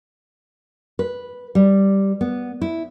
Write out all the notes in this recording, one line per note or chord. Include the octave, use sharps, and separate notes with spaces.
B4
G3
B3
E4